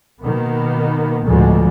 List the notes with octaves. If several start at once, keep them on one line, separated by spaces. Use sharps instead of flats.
B2 D#3 A#3 B3
A1 D2 B2 D3 F3 G#3